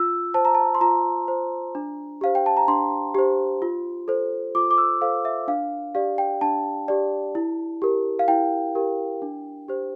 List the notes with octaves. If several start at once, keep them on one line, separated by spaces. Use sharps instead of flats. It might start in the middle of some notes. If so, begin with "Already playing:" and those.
Already playing: F4 E6
C5 A5
A#5
A5
C6
F4 A#5
C5
D4
G4 C5 F5
G5
A5
A#5
D4 C6
G4 C5
F4
A4 C5
F4 D6
D6
E6
A4 C5 F5
E5
D4 F5
G4 D5 F5
G5
D4 A5
G4 D5
E4
G4 A#4
F5
E4 G5
G4 A#4
D4
G4 C5